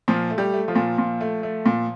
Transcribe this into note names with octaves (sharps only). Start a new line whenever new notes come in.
A#2 F3 F4
A3
G3 G4
A3
F3 F4
A#2
A#2
A3
A3
A#2